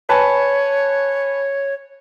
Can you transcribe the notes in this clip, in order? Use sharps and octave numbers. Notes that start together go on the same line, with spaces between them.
B4 C#5 G#5 A5